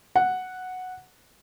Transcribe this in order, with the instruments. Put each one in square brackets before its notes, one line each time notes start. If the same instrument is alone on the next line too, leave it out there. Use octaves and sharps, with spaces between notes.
[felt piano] F#5